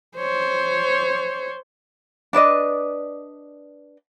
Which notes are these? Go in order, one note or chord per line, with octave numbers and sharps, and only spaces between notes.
C5 C#5
D4 B4 D5 D#5